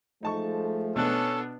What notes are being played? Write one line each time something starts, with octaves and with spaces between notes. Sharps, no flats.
F3 G#3 A3 D#4 A5 C#6
B2 B3 C#4 D4 A4 F#6